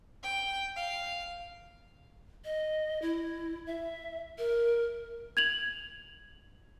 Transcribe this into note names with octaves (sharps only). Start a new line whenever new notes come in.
G5
F5
D#5
E4
E5
A#4
G#6 F7 F#7